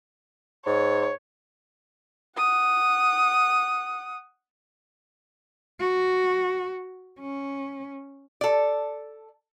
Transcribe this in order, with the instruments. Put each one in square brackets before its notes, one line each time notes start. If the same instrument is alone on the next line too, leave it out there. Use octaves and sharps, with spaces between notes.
[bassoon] G#2 [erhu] C#5
[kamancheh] F#5 D#6
[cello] F#4
C#4
[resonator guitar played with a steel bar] A4 D5